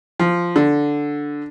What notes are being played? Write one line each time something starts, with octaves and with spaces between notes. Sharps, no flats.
F3
D3